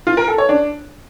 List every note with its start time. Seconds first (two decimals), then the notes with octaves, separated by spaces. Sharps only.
0.07 F4
0.17 A#4
0.28 A4
0.38 C#5
0.49 D4